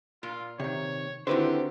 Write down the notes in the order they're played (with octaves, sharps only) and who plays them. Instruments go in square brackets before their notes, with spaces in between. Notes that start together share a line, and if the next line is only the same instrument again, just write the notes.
[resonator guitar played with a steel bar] A#2 [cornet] F4
[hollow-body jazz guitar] C3 D#3 [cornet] C#5
[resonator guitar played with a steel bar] D3 D#3 [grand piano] C4 F#4 [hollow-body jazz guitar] E4 B4 C5 [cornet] G4